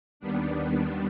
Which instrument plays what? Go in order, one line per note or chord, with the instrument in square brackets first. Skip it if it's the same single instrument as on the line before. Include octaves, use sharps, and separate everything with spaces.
[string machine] D#2 D#3 G3 B3 D4